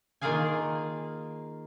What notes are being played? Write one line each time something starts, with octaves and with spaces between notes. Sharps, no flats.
D#3 A#3 F4 G#4 F5 G#5